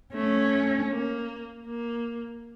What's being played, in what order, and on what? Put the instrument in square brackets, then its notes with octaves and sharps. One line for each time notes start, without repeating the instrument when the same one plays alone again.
[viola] A3 [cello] C#4
[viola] A#3
A#3